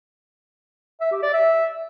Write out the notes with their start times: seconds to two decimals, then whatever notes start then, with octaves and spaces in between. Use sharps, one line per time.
1.01 E5
1.12 G4
1.23 D5
1.33 E5